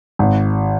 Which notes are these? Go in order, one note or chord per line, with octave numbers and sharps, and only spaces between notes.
G#1